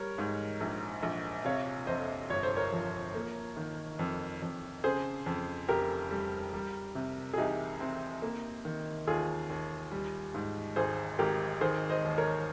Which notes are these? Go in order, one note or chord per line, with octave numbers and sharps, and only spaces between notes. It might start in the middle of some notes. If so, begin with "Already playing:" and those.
Already playing: G3 A#4 C#5
G#2
A#1
A#1
C3 C#5 F5
F2 C5 D#5
G1 C#5
C5
A#4 C#5
F3
A#3
D#3
F2
F2
C#3 G#4 C5
F2
F1 G4 A#4
G3
G3
C3
G#4
C2 D#4 G4
C4
A#3
D#3
D#2 F4 G#4
D#2
G3
G#2
G#1 G#4 C5
G#1 G4 A#4
D#3 G#4 C5
C5 D#5
D#2
A#4 C#5